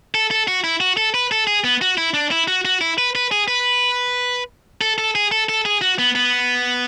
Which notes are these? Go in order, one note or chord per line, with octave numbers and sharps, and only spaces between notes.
A4
A4
F#4
E4
F#4
A4
B4
A4
G#4
B3
F#4
E4
D4
E4
F#4
F#4
E4
B4
B4
G#4
B4
A4
A4
G#4
A4
A4
G#4
F#4
B3
B3